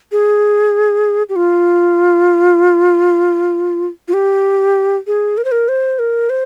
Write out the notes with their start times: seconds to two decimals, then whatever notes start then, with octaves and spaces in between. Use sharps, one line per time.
0.12 G#4
1.29 G4
1.36 F4
4.08 F4
4.13 G4
5.07 G#4
5.37 A#4
5.45 C5
5.52 A#4
5.68 C5
5.99 A#4
6.30 C5